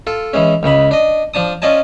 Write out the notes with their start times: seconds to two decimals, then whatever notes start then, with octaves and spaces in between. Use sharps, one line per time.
0.07 F4 A4
0.33 E3 G#3 C#4
0.63 C#2 C#3 G#3 B5
0.91 D4 D#5
1.34 F3 D4 A5 D#6
1.62 C#4 F4 D5 D#5 G#5 A5